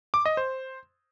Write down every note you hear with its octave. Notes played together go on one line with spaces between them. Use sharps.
D6
D#5
C5